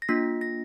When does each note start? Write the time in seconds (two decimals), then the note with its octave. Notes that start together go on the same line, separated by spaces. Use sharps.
0.02 A#6
0.09 A#3 D4 F4 B6
0.41 A#6